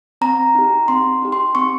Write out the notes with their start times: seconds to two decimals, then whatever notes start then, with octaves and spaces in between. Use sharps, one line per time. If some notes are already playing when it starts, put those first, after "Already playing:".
0.21 C4 A#5
0.55 D#4 G4
0.88 C4 C6
1.22 D#4 G4
1.32 C6
1.55 C4 C#6